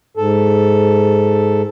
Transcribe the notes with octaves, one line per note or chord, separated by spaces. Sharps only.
G#2 A4